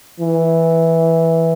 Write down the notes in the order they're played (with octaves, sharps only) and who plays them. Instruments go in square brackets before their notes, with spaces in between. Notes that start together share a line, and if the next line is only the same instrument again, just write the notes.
[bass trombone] E3